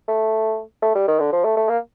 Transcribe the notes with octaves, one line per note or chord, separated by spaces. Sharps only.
A3
A3
G3
D#3
D3
F3
A3
A3
A#3